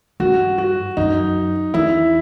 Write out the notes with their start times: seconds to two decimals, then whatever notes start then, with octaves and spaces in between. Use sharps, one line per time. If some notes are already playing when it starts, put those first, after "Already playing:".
0.20 G2 F#4
0.58 F#4
0.97 F#2 D#4
1.74 E2 E4